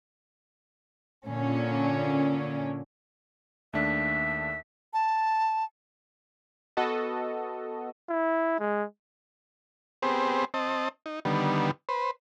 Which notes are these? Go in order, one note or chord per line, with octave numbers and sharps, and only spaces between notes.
A#2 D3 C#4
D#2 A3 D4 E5
A5
B3 F#4 A4 D#5
E4
G#3
B3 C4 G4 G#4 C5
C4 D#5 A5
D#4
D3 D#3 G3 B3
B4 C5